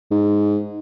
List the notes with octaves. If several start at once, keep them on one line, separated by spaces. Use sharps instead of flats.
G#2